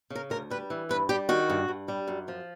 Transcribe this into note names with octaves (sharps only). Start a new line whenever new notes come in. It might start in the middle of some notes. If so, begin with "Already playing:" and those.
C#3
A#4
D2 A#4
G3 B4
E3
G2 B4
G3 G4
D#3 F#4
G2
G2
G3
F#2
F3